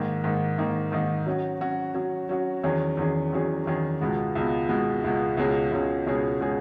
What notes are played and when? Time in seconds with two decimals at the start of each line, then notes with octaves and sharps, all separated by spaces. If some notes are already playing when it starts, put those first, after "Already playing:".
Already playing: G#2 D#3 A#3 D#4
0.24 G#2 D#3 A#3 D#4
0.58 G#2 D#3 A#3 D#4
0.92 G#2 D#3 A#3 D#4
1.26 F#3 C#4 F#4
1.61 F#3 C#4 F#4
1.94 F#3 C#4 F#4
2.29 F#3 C#4 F#4
2.64 E2 D#3 F#3 C#4 G#4
2.97 E2 D#3 F#3 C#4 G#4
3.32 E2 D#3 F#3 C#4 G#4
3.66 E2 D#3 F#3 C#4 G#4
4.01 C#2 B2 G#3 B3
4.35 C#2 B2 G#3 B3
4.69 C#2 B2 G#3 B3
5.04 C#2 B2 G#3 B3
5.37 C#2 B2 G#3 C#4 G#4
5.72 C#2 B2 G#3 C#4 G#4
6.06 C#2 B2 G#3 C#4 G#4
6.41 B2 G#3 C#4 G#4